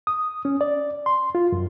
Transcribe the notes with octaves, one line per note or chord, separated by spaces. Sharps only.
D#6
C#4
D5
C6
F4
F#2